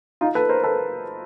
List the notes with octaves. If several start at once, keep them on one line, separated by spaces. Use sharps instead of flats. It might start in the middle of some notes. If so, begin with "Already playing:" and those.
D#4 F4
A4 B4
A#4 C5
A4 B4